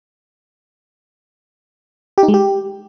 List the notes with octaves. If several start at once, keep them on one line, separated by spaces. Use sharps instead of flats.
G4
D#4
G#3
G4